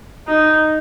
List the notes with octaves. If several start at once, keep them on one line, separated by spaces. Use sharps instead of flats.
D#4